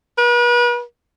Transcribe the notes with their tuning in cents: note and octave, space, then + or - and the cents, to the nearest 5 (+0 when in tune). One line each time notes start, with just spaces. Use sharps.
B4 -40